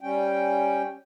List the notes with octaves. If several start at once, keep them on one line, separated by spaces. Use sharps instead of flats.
G3 C#4 G5